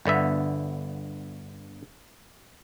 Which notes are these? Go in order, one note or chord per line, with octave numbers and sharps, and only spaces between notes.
G1 D3 B3 E5